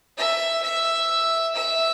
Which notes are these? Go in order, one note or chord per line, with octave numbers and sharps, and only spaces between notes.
E5
E5
E5